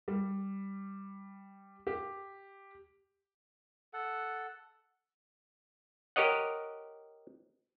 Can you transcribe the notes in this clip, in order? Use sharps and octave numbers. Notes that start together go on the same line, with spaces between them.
G3
G4
A4 F#5
G4 A#4 C#5 D#5 F#5